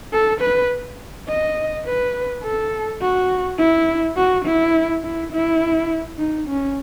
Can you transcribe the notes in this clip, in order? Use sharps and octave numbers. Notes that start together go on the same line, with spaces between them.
A4
B4
D#5
B4
A4
F#4
E4
F#4
E4
E4
E4
D#4
C#4